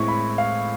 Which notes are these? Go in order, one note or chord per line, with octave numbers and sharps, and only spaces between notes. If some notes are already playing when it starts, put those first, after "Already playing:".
Already playing: A2 E3 G#3 C4 C#6
B5
F5